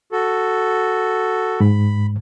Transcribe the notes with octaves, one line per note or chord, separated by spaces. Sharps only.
F#4 A4
G#2 B5